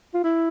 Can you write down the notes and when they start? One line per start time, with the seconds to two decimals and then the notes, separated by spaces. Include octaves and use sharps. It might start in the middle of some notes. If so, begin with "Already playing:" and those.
0.14 F4
0.24 E4